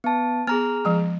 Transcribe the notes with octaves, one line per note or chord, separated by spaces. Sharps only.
B3 A5
B3 G#4 A#5 F6
F3 G#3